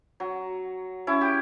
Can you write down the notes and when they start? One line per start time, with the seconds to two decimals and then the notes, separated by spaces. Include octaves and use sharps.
0.20 F#3
1.07 C#4 E4
1.21 G4